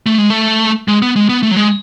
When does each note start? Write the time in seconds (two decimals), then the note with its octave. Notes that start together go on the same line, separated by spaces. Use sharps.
0.06 A3
0.18 G#3
0.30 A3
0.88 G#3
1.02 B3
1.16 G#3
1.29 B3
1.43 A3
1.51 F#3
1.57 G#3